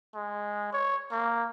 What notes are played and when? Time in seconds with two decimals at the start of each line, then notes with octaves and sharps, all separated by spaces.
0.15 G#3
0.73 C#5
1.12 A#3